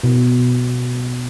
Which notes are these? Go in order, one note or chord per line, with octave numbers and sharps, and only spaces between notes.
B2